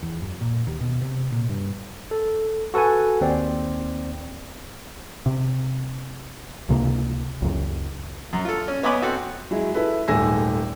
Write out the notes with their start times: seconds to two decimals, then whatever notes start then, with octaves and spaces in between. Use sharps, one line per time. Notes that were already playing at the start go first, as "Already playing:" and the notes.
0.03 E2
0.22 F#2
0.41 A#2
0.67 D#2
0.81 B2
1.02 C3
1.32 A#2
1.49 G2
2.11 A4
2.74 F#4 A4 B4 F#5 G#5
3.21 D#2 C4 D5
5.26 C3
6.69 C#2 C3 A#3
7.42 C#2 F#2
8.33 F#2
8.45 F4 A4
8.68 C#4
8.83 B3 C#5 D#5 G#5 B5 D6
9.02 C4 F#4 A4
9.51 F#3 G#3 E4
9.74 E4 A4 B4
10.08 D#1 G#1 A3 G#5 E6 A#6